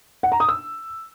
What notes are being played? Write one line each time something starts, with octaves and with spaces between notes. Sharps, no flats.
F#5
A#5
D#6
E6